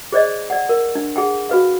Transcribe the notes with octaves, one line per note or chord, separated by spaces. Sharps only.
G#4 C5 D5 D#5
D5 F#5
A#4
D4
G#4 F#5 G5
F#4 B4 F5